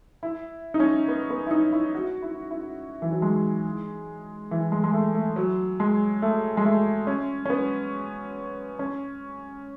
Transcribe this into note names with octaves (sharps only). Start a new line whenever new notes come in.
E4
D#4
C#4
B3
B3
E4
D#4
E4
F#4
E4
E4
E3
F#3
G#3
E3
G#3
G#3
A3
A3
F#3
G#3
A3
G#3
A3
C#4
C#4
B3
C#4